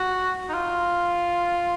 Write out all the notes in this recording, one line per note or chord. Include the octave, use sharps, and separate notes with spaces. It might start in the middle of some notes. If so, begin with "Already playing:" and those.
Already playing: F#4
D#4
F4